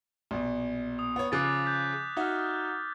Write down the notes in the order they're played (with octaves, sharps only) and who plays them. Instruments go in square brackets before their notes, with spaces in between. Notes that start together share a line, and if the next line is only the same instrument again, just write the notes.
[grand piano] A#1 B2
[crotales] D#6
[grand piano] B3 C#5
[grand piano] C#3 F3 [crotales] D6 F#6 A6
[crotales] F#6 G6 B6
[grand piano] D#4 F#4 E5 [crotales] F6 G#6